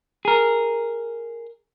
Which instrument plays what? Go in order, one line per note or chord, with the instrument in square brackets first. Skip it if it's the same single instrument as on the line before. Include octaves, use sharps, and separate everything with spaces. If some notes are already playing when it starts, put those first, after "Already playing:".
[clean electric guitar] G#4 A#4